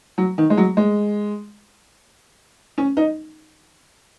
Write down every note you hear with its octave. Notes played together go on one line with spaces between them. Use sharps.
F#3
D#3
G#3
F#3
G#3
C#4
D#4